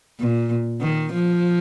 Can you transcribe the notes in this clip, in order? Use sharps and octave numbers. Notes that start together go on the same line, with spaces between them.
A#2
D#3
F3